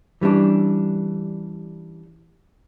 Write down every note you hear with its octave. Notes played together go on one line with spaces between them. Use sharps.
E3 G3 C#4 D4